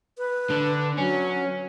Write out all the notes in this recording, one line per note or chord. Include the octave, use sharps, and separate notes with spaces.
B4
D3 D4
F#3 C#4